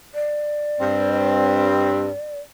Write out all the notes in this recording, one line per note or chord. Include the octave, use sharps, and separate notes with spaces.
D5
G2 C4